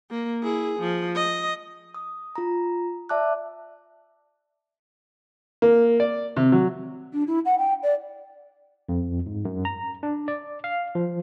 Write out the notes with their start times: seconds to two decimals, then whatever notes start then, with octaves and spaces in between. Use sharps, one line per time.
0.11 A#3
0.43 E4 G#4
0.80 F3
1.15 D#5
1.94 D#6
2.36 F4 A#5
3.09 D5 E5 A5 D6 F#6
5.62 A#3
6.00 D5
6.36 C3
6.52 F#3
7.13 D4
7.27 E4
7.45 F#5
7.58 G5
7.83 D5
8.89 F2
9.26 G#2
9.45 F#2
9.65 A#5
10.03 D4
10.28 D5
10.64 F5
10.95 F3